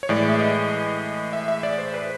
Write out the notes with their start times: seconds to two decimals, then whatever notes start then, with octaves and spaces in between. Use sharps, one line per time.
0.03 C#5
0.09 A2 E3 G#3 D5
0.29 E5
0.40 D#5
1.33 E5
1.48 E5
1.63 D5
1.78 C5
1.94 B4